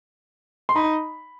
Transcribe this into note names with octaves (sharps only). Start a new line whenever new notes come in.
C6
D#4 B5